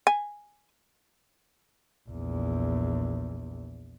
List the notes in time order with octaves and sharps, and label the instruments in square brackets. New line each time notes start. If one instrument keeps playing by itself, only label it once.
[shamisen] G#5
[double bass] A#1 E2